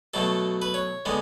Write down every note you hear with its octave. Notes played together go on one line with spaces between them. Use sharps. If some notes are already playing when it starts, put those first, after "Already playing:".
B2 F#3 A3 A4
B4
C#5
D3 G#3 B3